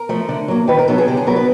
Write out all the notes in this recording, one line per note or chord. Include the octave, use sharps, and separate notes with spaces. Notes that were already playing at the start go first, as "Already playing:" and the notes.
Already playing: A#4
F3 A3
D3
F#3 A#3
D#3 B4
A#4
F#3 B3 A4
G#4
D3 G4
G#4
F#3 B3 A#4
B4